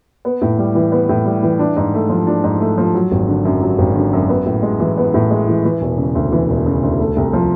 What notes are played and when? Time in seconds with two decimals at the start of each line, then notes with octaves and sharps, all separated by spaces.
0.25 B3
0.42 A2
0.58 G3
0.75 E3
0.92 B3
1.09 A2
1.25 G3
1.43 E3
1.59 D4
1.76 G#2
1.94 A3
2.09 F3
2.27 D4
2.44 G#2
2.60 A3
2.78 F3
2.95 F#3
3.11 G#1
3.28 D3
3.45 F#2
3.62 F#3
3.78 G#1
3.96 D3
4.13 F#2
4.29 B3
4.46 A2
4.63 G#3
4.80 E3
4.98 B3
5.14 A2
5.30 G#3
5.48 E3
5.65 E3
5.81 E1
5.98 C#3
6.15 D2
6.32 E3
6.49 E1
6.66 C#3
6.83 D2
6.99 A3
7.16 C2
7.33 F3